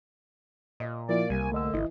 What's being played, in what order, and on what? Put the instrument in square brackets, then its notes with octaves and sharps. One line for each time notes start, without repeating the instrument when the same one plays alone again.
[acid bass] A#2 [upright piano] D#5
[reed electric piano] F3 E4 F4 [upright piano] A#3 [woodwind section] D5
[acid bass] C2 [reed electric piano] C3 G3 [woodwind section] G#5
[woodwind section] D3 [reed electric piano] A3 D#5 E6
[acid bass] G#1 [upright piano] E3 [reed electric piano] E4 D#5